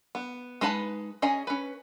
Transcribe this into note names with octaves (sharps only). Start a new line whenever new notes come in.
B3
G#3 D#4 B4 A5 B5
C#4 G#4 D#5 G#5 A#5
C#4 B4